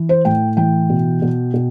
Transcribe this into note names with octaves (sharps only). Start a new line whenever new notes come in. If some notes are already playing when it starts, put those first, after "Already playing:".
Already playing: E3
C5
A2 G5
E3 G5
B2
B2
B2